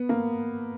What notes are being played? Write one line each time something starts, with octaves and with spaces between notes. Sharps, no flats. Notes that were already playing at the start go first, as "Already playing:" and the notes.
Already playing: B3
A#3